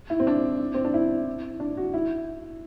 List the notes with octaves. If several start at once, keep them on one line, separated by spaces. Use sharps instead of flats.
E4
C4
D4
C4
D4
E4
D4
F#4
E4